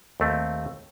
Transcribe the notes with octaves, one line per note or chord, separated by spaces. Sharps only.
D#2 A3 C4